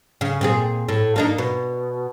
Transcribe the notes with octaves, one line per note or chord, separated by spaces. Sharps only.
C#3
A#2 C4 G#4
A2
A#3 D4 D#4
B2